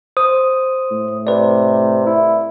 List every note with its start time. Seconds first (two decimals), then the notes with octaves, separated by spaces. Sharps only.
0.17 C5 D#6
0.91 A2
1.27 C3 B4 D5
2.06 E4